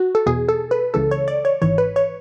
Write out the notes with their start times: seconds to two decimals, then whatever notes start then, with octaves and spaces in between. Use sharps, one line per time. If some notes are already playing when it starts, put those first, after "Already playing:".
Already playing: F#4
0.15 A4
0.26 E2 B2 G#4
0.49 A4
0.71 B4
0.94 C#2 C#3 E3 A4
1.11 C#5
1.28 D5
1.45 C#5
1.62 G#1 G#2 E3 C#5
1.78 B4
1.96 C#5